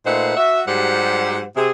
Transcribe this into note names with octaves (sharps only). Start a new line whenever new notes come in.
A#2 A3 D#4 B4 C5 F#5
F#4 E5
G#2 F#3 G3 G4 C5 F#5
C3 G#4